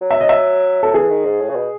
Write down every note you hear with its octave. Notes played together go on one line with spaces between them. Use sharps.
F#3
E5
D#5
E5
F#3 A4
E3 G#4
D#3
G#2
A2
C#3
B2